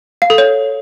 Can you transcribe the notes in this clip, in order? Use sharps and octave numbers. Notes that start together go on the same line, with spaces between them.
F5
A4
C#5